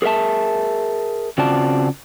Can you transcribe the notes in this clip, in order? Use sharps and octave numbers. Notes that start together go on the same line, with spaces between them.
G#4 A#4 C5 E5 A5
C#3 C4 F4 F#4 D5 A5